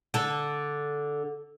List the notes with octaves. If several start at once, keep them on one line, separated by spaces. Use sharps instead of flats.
D3 A4